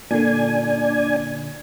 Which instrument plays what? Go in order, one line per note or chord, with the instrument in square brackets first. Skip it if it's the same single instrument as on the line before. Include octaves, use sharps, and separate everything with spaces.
[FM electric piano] A#2 D3 [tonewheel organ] D4 G#5